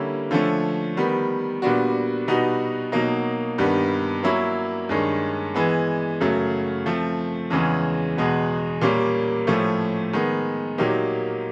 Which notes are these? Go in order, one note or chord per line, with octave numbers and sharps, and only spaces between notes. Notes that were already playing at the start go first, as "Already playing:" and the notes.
Already playing: D3 G3 A#3 C#4 E4
D3 F3 A3 C#4
D#3 G3 B3
A#2 G3 B3 D4 F#4
B2 G3 B3 D#4 F#4
B2 F#3 A#3 D#4
G2 D#3 G3 B3
F#3 A#3 C#4 E4
G2 D#3 G#3 C#4
E3 G#3 B3
F#2 C#3 F#3 A3
F3 A3 C4
E2 C#3 E3 G#3 C#4
E2 B2 G#3 B3
A#2 G3 A#3 C#4
A2 F3 A3 C#4
D#3 G#3 B3
A#2 F#3 A#3 D#4 G4